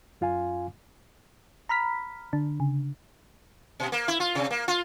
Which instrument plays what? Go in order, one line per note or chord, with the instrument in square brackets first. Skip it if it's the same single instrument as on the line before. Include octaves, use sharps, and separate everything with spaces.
[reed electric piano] F#2 F4 F5 G#5
[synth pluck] A#5 B5 F6 B6
D3 D4
C#3
[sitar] B2
A#3
E4
F4
C3
A#3
F4